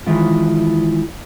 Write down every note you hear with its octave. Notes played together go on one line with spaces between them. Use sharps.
D#3 E3 G#3 E4 F4